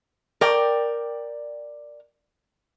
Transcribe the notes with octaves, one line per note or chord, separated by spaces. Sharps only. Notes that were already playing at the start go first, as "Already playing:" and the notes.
A#4 D5 G5